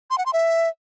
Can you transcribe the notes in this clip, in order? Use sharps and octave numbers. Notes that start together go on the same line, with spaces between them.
C6
F#5
C6
E5